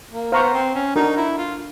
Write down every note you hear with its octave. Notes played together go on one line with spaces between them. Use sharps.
A#3
B3 C5 F5 A#5 C#6
C4
C#4
D4 D#4 F#4 A#4
E4
F4